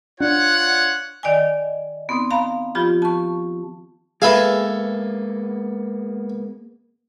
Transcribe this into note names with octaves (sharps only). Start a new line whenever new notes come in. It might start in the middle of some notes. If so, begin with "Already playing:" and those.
D4 F4 C#5 F#5
D#3 D5 D#5 G5 G#5
B3 C4 D#4
F5 A#5 B5
F3 F4 G4 B5
A5 C#6
G#3 A#3 B3 G#4 A4 B4 E5 F5